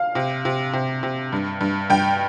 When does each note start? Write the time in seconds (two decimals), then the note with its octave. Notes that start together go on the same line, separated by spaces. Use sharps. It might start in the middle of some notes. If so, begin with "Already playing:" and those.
Already playing: F5
0.15 C3
0.45 C3
0.73 C3
1.03 C3
1.32 G2
1.61 G2
1.90 G2 G5